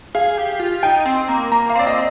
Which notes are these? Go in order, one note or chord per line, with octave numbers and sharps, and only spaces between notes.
G#4 F5
G4
F4
D#4 G5
C4
A#3
A#3 A#5
F5
C4 D5
D#5